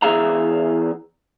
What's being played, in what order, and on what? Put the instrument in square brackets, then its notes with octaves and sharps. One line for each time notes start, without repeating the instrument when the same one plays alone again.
[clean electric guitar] E2 E3 G#4 E5 F5 A#5